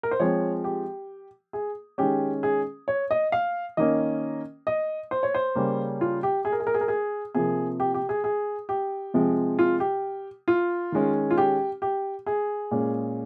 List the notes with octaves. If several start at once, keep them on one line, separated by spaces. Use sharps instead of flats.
A#4
C5
F3 G#3 C4 C#5
G4
G#4
D#3 G#3 C#4 G4
G#4
C#5
D#5
F5
D#3 A#3 C#4 D#5
D#5
C5
C#5
C5
C#3 G3 A#3 C#4
F4
G4
G#4
A#4
G#4
A#4
G#4
A#4
G#4
C3 F3 A#3 G#4
G4
G4
G#4
G#4
G4
C3 F3 G#3 C4
F4
G4
F4
D#3 G#3 C#4
F4
G4
G4
G#4
A#2 G#3 C#4